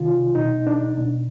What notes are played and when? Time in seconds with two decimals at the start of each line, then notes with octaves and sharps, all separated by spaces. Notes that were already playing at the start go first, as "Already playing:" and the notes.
Already playing: C3 D#3 F4
0.35 B2 D#4
0.67 D4
0.97 B2